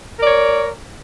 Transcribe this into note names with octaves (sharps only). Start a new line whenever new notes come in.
A#4 C#5 D5